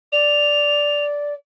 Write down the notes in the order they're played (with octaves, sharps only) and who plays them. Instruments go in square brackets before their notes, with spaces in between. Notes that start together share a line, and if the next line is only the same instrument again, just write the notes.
[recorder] D5 [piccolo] F7